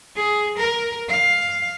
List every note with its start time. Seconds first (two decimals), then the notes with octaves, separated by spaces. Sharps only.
0.16 G#4
0.58 A#4
1.09 F5